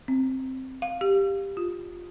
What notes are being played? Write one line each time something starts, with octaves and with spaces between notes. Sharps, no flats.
C4
F5
G4
F4